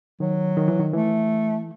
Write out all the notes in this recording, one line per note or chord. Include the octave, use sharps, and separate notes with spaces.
D#3 F#3
D#3
E3
D#3
E3 A3